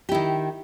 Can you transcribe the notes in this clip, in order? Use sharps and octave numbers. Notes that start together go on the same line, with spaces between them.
D#3 E4 G4